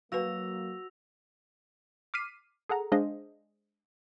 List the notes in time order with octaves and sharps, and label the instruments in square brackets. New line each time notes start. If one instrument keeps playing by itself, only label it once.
[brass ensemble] F#3 A#3 [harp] F#4 [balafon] B4 F5 [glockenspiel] E6 A#6 F7
[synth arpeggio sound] D6 F6 B6 C7 D#7
G#4 A4 F#5 A#5
G#3 D4 G#4 C5 D#5 F5